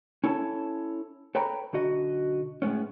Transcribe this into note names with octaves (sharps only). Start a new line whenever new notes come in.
C#4 E4 A4 C#5 G#5 A5
A4 B4 C#5 G5 A#5 B5
B1 D3 F#4 D#5
A2 G#3 B3 C#4